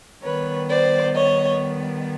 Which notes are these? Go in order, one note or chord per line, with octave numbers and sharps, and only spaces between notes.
D#3 G3 B3 B4 C#5
C5 D5
C#5 D#5